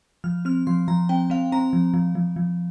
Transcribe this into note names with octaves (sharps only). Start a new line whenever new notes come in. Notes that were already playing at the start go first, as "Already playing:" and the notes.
F3 F6
C4 F6
F3 C6
F3 A#5
C4 G5
C4 F5
C4 A#5
F3
F3
F3
F3